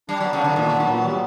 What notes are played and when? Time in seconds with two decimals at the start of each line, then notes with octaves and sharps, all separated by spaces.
0.09 G3 D4
0.20 F#3 B3
0.33 C#3
0.40 D3 D4
0.56 A#2 D#3
0.72 B3
0.80 F#3
0.88 A#2
1.04 G3